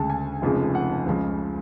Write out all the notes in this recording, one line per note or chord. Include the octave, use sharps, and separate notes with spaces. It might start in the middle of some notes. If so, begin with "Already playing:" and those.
Already playing: D2 C#3 G#3 A5
G#5
F1 F2 C#3 F3 G#3
F#5
C#2 C#3 F3